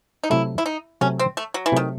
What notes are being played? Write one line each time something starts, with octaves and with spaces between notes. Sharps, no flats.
D#4
C3 F#3 A3 E4
E4
D#4
C3 F#3 A3 C#4
C4
A3
F#3
E3
C3 D#3 F#3 A3